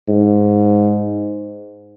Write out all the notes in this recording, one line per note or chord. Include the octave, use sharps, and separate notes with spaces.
G#2